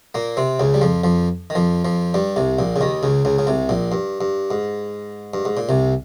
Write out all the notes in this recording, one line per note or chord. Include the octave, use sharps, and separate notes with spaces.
A#2 A#3
C3 C4
C#2 C#3
G3
F2 F3
F2 F3
D#3
F2 F3
F2 F3
G2 G3
C2 C3
A#1 A#2
C#3
D#2 D#3
C#2 C#3
C#2 C#3
C#3
C2 C3
A#1 A#2
G2
G2
G#2
G2
G#2
A#2
C2 C3